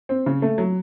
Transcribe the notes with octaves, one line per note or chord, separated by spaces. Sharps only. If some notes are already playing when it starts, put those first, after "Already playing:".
C4
C#3
A3
F#3